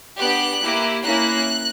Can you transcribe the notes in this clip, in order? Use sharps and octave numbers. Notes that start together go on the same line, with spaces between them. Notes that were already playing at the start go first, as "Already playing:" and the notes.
B3 D4 G4 F#6
A#3 E4 G4
A#3 C#4 E4 F#6